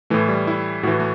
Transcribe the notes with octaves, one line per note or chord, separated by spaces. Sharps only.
A2 E3 A3
G3
E4
A2 E3 F#4
A3